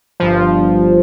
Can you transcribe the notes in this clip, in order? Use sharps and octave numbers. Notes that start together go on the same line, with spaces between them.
G1 G2 F3